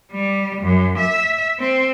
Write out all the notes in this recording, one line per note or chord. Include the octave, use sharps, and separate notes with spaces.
G3
F#2
E5
C4